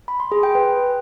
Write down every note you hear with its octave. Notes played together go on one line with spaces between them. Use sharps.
B5
C6
G#4
G5
B4